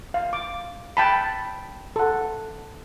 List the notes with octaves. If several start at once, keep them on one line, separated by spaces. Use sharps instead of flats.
F5
D6
G5 A5 B5
A4 F#5